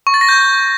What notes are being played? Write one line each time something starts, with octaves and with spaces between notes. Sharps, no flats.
C#6
A6
A#6
G6